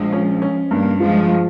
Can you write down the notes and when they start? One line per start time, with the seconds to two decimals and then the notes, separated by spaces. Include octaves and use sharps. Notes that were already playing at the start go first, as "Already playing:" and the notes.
Already playing: A#1 F3 G#3
0.12 C#4
0.42 C#4
0.71 G2 G3 A#3
1.00 F3 G#3 F4